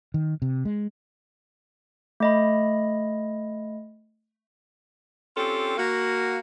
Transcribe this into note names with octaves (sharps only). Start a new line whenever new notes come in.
D#3
C3
G#3
A3 D#5 B5
C4 C#4 F4 G4 A4
A#3 F#4